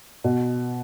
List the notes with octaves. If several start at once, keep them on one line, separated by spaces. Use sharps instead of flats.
B2